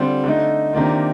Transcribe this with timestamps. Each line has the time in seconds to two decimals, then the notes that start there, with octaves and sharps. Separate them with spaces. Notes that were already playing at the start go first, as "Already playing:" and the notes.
Already playing: D3 G3 C4 F4
0.24 D3 A3 D#4
0.73 C3 D#3 A#3 D4 F4